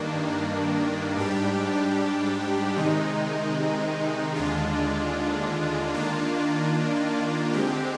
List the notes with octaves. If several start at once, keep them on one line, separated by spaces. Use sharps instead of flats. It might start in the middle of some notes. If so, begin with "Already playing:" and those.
Already playing: G2 D#3 A#3 D4
G#2 G3 D4 G4
C3 D#3 G#3 D#4
D#2 D3 G#3 D4 F4
D#3 A#3 D4 F4
D3 G#3 C4 G4